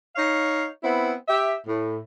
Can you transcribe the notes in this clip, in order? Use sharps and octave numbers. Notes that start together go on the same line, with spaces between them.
D#4 C#5 F5
B3 C4 E4
G4 E5
A2